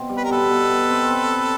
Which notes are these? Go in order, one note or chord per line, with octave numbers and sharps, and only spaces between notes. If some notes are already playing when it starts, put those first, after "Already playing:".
Already playing: B2 C4
G3
B4
A#4
B2 A4 B4
B2
B2
C4
C4